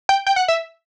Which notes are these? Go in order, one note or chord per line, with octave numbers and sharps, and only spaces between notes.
G5
G5
F#5
E5